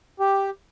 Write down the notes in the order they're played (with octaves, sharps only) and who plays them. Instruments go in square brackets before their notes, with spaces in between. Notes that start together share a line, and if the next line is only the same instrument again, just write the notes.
[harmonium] G4